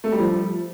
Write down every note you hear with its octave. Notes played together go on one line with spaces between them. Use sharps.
A3
G3
F3